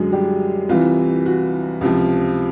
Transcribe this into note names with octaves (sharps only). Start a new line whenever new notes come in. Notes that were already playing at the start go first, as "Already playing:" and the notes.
Already playing: F#2 D3 F#3 G#3 G#4
G3 G4
C2 C3 E3 F4
F#4
C#2 C3 F3